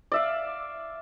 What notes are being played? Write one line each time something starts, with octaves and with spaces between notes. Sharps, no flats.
D5 E5 F5